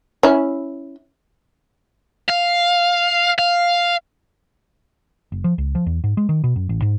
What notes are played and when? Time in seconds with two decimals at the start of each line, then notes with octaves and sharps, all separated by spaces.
0.23 C#4 E4
2.30 F5
3.39 F5
5.32 F#1
5.44 F3
5.58 C#2
5.75 F3
5.86 E2
6.04 G#2
6.17 G#3
6.29 D#3
6.44 B2
6.56 F#2
6.69 A1
6.82 G#2